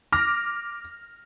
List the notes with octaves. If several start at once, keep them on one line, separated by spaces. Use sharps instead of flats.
D6 F6 A#6